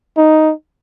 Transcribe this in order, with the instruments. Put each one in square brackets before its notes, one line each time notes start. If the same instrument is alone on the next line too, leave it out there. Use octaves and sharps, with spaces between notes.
[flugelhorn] D#4